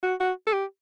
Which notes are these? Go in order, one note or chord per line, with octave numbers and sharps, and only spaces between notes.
F#4
F#4
A4
G4